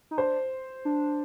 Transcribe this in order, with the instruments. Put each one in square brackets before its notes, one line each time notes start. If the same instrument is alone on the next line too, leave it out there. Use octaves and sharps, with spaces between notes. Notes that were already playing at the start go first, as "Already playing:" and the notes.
[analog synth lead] D#4
[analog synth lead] D4 [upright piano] C5
[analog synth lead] D4